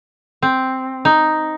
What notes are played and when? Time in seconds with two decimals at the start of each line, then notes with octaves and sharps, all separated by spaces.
0.42 C4
1.05 D#4